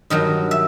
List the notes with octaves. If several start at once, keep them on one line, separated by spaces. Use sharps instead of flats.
G2 D#3 F#3 D#5
E5